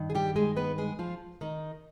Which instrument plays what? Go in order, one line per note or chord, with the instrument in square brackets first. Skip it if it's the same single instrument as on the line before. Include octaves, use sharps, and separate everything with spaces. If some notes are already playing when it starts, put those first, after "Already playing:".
Already playing: [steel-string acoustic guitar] G2 D#3
G#4
G3 G4
G#3 G#4
B3 B4
G#3 G#4
F3 F4
D#3 D#4